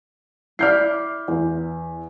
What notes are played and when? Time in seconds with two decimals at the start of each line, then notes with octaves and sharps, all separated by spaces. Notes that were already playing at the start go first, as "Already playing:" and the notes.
0.59 E4 D5 F6 G6 C7
1.28 E2